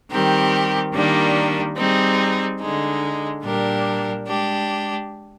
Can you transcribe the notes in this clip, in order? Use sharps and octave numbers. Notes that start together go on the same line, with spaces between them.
D#3 G3 C4 G4 A#4
D#3 G3 A#3 D4
G3 C4 D#4 G#4
D3 G#3 D#4
A#2 G3 D4 G4 A#4
G#3 D4 G4